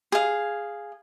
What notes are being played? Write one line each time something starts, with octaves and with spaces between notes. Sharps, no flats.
G#4 F5